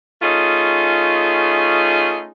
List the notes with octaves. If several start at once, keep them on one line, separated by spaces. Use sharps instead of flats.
A3 C#4 D#4 F4 G#4